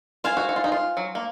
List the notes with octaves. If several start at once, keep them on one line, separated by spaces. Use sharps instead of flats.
F4 C5 F5 G#5
F#4
F#4
F4
D#4
F4
F#3
A#3